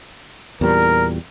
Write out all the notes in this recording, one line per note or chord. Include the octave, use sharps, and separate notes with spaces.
E2 A#2 G3 A#4